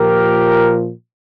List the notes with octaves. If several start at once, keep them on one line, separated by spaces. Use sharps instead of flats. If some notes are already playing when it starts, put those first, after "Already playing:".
Already playing: A#2 F3 G4 A#4